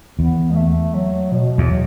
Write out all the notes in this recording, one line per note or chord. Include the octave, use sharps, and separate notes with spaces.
E2 B3
G#3
A3
F#3
B2
E2
F#3